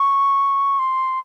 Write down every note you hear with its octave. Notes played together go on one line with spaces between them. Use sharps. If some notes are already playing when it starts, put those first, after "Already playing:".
Already playing: C#6
C6